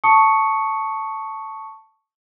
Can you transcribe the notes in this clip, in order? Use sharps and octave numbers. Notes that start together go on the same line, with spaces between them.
A5 C#6 D#6 C#7